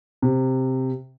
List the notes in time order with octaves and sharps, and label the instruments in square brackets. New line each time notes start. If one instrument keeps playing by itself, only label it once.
[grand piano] C3